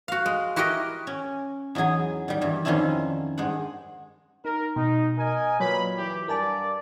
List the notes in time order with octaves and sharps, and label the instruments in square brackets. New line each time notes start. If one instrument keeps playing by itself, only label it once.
[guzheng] F#4 F5
G#3
E4 F#4 G4 A#4 D#5
C#4
E2 F#3 D#4 G#4 G#5
D#3 G3
G2 E3
F2 D#3 F3 C#4 D4 E4
G2 G#3 C5 F#5
[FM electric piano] D#4 [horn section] A#4
[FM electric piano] B2 [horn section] D#4
[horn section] A#4 D#5 G#5
[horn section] A#2 B4 B5 [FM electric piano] F#3 C#5
[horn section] E3 G4
[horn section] G2 D5 [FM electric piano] A#4 G#5 A5